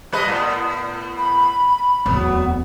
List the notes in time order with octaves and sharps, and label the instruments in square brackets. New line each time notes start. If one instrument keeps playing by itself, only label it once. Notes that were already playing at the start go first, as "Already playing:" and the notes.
[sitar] G3 B4 D#5
A2 B3
[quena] B5
[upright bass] D1 E2 [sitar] F#3 B3